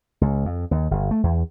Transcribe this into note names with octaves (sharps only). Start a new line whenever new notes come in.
C#2
F2
D#2
G1
A3
E2